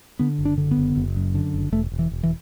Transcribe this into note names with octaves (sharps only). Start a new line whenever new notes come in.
D3 B3
F#1
D4
D3
B3
F#1
F#1
F#2
D3
F#1
E1 A3
E1
E3
E1
E3